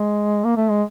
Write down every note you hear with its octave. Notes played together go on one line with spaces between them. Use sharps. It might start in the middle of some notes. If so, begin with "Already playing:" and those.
Already playing: G#3
A#3
A3
G#3